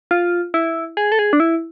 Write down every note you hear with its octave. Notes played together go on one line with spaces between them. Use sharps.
F4
E4
G#4
A4
G#4
D4
E4